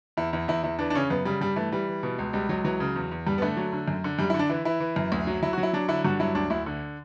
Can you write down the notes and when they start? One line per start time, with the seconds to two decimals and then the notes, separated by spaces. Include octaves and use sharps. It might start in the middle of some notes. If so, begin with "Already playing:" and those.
0.17 E2 E4
0.33 E2 E4
0.48 E2 E4
0.64 E2 E4
0.79 E3 D4
0.90 D4
0.95 C#3 C#4
1.10 F#2 B3
1.25 C#3 G3
1.41 G2 G3
1.56 E3 A3
1.72 E3 G3
1.88 E3
2.03 B2
2.19 C#2
2.33 C#2 G3
2.49 C#2 F#3
2.64 E3 F#3
2.80 C#3
2.96 E2
3.11 E2
3.26 G2 G3
3.38 B3
3.42 D3 A3
3.57 F#3
3.73 D3
3.88 F#2
4.04 D3
4.19 F#2 G3
4.30 E4
4.34 D3
4.39 D4
4.50 E3 E4
4.65 E3 E4
4.80 E3
4.96 F#2
5.12 D2
5.27 F#3
5.42 F#3 E4
5.53 F#4
5.58 F#3
5.63 E4
5.73 F#3 D4
5.88 D3 E4
6.04 G2 F#4
6.20 F#3 E4
6.35 D2 D4
6.50 D2 E4
6.66 D3